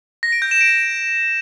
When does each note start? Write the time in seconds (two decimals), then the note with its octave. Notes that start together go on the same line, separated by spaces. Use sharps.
0.23 A#6
0.32 D7
0.42 G6
0.51 E7
0.61 D7